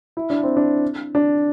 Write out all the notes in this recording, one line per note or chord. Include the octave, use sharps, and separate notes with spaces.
E4
D4
C4
D4
D4